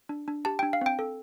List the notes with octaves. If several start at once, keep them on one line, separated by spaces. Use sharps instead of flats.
D4
D4
G4 A5
D4 G5
F5
C4 G5
A4